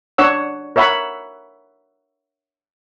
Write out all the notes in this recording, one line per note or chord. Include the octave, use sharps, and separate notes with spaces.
D4 C#5 F#5 E6
A#4 C#5 E5 F#5 B5